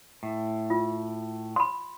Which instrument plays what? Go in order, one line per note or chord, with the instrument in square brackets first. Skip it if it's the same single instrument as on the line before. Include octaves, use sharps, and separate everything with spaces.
[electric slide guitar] A2
[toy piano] F4
B5 C6